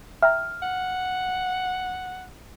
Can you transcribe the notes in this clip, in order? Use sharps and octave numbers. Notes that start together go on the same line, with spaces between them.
E5 G5 A#5 F6
F#5